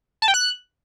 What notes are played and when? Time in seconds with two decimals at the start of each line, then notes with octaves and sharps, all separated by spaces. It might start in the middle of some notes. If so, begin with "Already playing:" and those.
0.22 A5
0.28 G5
0.34 F#6